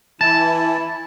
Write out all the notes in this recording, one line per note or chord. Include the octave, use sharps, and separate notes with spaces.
E3 E4 A5